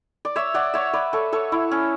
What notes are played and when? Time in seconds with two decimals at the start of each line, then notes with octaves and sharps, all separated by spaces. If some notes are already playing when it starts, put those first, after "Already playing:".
0.25 D5
0.36 C#5 E5
0.54 D5 F#5
0.74 C#5 E5
0.93 B4 D5
1.13 A4 C#5
1.33 A4 C#5
1.52 E4
1.71 C#4